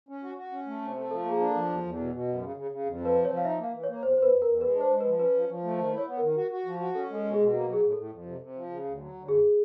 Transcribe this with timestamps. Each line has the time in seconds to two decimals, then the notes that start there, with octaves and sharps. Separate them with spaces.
0.09 C#4
0.23 F#4
0.38 F#4
0.52 C#4
0.67 A3
0.82 C3
0.96 A3
1.11 F3 A4
1.25 A#3 G#4
1.40 D4
1.50 F3 A4
1.69 E2
1.83 E2
1.99 B2
2.12 B2
2.28 F#2
2.42 C#3
2.56 C#3
2.71 C#3
2.86 F2
3.00 F3 B4
3.15 C3
3.25 C#5
3.29 F3
3.37 F5
3.45 D#4 E5
3.58 A#3
3.63 F5
3.73 E3
3.84 C#5
3.88 A#3
4.03 E2 C5
4.17 E2 C5
4.22 B4
4.33 E2
4.42 A#4
4.46 E2
4.61 G#3 B4
4.75 D4
4.81 C5
4.90 G#3
5.01 B4
5.05 F3
5.19 C#4 B4
5.34 F3
5.49 F3
5.64 A3
5.78 D#3 C5
5.92 E4
5.98 C#5
6.07 B3
6.17 D#3 A#4
6.36 F#4
6.51 F#4
6.66 F3
6.80 F#4
6.95 C#4 A4
7.10 G#3 A4
7.24 B2
7.34 G#4
7.39 B2
7.53 A#3 F#4
7.67 F#3
7.73 G#4
7.82 A2
7.92 A4
7.97 A2
8.11 F2
8.26 C3
8.41 C3
8.56 F3
8.70 C#3
8.85 D2
9.00 F#3
9.14 D2
9.28 F#2 G#4